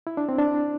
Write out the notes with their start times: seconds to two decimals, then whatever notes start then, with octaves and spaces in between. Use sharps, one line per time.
0.07 E4
0.17 D4
0.29 C4
0.38 D4